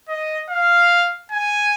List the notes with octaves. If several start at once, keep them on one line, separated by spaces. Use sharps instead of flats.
D#5
F5
G#5